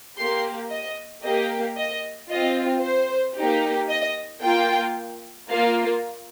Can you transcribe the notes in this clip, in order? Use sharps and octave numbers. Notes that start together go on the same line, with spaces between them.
A#3 G4 C6
D#5
A#3 G4 D#5
D#5
C4 F4 D#5
C5
A#3 D#4 G4
D#5
A#3 F4 G5
A#3 F4 F5